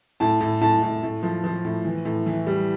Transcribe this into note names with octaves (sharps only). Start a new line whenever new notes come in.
A2 A5
A2
A2 A5
A2
A2
F3
F3
A2
E3
A2
E3
G3